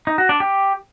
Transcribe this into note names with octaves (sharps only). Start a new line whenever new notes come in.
D#4
F#4
D4
G4